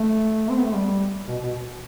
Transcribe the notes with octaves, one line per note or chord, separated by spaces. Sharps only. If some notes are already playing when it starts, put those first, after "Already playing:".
Already playing: A3
C4
B3
A3
G3
B2
B2